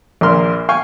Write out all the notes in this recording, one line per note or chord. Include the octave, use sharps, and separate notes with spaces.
A#1 A#2 A#4 C6 F6
F5 G5 G#5 C#6